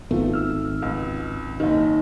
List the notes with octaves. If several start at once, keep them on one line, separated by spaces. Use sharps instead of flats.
G#1 A3 B3 F4
E6 F6
C#2
F#1 D#3